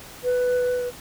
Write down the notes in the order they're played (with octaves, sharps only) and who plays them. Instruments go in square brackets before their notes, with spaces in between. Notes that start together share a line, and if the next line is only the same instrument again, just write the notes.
[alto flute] B4